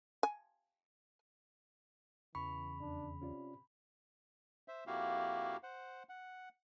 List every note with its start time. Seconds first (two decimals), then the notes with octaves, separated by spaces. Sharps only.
0.23 G#5
2.35 E2 C#3 E3 B5 C#6
2.80 F2 D4
3.22 C3 C#4 F4 D5
4.68 C5 E5
4.87 F2 A#3 E4 F#4 G4 F5
5.63 C5 F#5
6.09 F#5